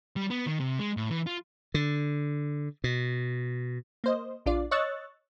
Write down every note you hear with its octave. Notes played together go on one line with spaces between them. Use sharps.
G3
B3
D#3
C3
G#3
A2
E3
F4
D3
B2
A#3 C5 D#5
A#1 D4 F4 D5
C#5 D#5 C#6 E6 F#6 A6